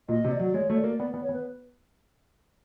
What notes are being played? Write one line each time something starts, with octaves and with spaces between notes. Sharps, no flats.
A#2 D#5
C3
D5
F#3
G#3 C#5
A3
C#5
D5
A#3
B3 D5
B3
C#5
B3
B4